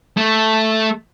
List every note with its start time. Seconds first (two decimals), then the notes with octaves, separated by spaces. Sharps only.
0.17 A3